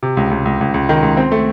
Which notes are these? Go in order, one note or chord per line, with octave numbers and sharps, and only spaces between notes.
C3
C#2
C#2
C#2
C#2
C#2
D#3
C#2
C4
A3